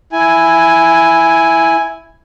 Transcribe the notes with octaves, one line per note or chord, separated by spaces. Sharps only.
E4 G#5